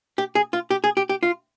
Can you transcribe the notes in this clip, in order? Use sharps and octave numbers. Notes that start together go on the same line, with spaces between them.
G4
G#4
F4
G4
G#4
G4
G4
F4